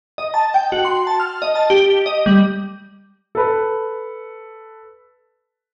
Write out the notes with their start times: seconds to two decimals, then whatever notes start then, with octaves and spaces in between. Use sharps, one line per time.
0.18 D#5
0.34 A5
0.54 G5
0.72 F#4
0.85 C6
1.07 A5
1.20 F6
1.42 D#5
1.55 A5
1.70 G4
2.06 D#5
2.26 G3
3.35 A4 B4